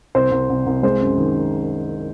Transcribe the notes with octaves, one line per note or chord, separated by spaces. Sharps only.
C2 C5
C2
C2
C2
G#3 C5
F#2
D#3